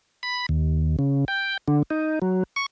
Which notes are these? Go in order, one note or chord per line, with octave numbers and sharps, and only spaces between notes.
B5
D#2
C#3
G5
D3
D#4
F#3
C#6